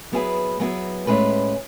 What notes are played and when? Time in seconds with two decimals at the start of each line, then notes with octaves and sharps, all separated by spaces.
0.12 F#3 B3 E4 G#4 B4
0.60 F#3 B3 E4 G#4 B4
1.07 A2 G#3 C#4 E4 B4